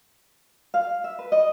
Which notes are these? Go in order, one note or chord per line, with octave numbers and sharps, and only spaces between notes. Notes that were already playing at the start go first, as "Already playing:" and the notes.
F5
E5
B4
D#5